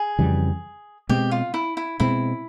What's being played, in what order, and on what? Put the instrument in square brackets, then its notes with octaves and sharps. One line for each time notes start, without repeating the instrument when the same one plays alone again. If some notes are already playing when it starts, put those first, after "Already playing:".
Already playing: [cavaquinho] G#4
[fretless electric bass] F2 C#3 E3 G3
[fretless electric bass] B2 G#3 C4 [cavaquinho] G4
[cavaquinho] F4
E4
E4
[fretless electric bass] B2 G#3 C4 [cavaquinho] E4